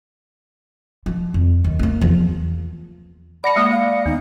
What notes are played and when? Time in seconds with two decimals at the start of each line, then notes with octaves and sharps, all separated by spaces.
1.06 F3
1.34 F2
1.64 D#2
1.79 A#3 B3
2.01 E2 F3
3.44 D5 F#5 A5 B5 A#6 C#7
3.56 G#3 A#3 D#6
3.71 A#3 F5
4.06 D#2 B3 D#4